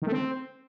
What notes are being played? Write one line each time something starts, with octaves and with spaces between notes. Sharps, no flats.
D#3
A3
C4